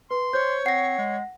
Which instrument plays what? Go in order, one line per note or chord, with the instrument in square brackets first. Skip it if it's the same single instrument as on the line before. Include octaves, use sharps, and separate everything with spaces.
[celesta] B4 [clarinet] C6
[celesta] C5 G6 [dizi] C#5
[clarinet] C4 [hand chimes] F#5 A#6 [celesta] C7
[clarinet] G#3